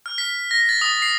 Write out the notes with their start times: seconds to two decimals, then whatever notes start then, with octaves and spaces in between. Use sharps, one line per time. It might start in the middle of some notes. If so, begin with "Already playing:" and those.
0.06 F6
0.18 B6
0.51 A#6
0.69 A6
0.81 D#6
1.02 C7